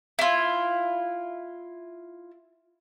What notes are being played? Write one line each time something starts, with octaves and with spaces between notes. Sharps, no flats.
E4 F4